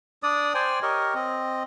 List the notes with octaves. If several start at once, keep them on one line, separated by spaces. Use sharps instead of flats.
D4 D5 D#6
C5 D5 G5 G#5
G4 A#4 C#5 D#5
C4 D#5